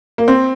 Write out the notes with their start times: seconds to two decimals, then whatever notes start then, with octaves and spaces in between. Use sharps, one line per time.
0.18 A#3
0.28 C4